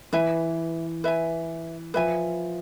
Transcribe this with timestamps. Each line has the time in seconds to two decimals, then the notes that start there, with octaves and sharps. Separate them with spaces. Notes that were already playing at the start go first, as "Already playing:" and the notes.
0.13 E3 B4 E5 G#5
1.04 B4 E5 G#5
1.94 F3 B4 E5 G#5